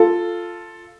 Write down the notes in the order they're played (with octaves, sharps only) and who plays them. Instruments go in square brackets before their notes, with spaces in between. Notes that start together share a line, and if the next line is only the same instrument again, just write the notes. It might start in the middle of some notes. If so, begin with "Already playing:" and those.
Already playing: [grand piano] F4 A4